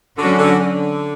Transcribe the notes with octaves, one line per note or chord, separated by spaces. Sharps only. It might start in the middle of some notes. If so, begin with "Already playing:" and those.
D3 F#3 C#4 F#4
D3
D3